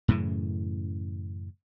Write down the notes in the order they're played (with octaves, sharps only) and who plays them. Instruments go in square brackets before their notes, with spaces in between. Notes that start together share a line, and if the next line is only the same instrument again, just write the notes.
[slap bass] F#2 A2 C#3 E3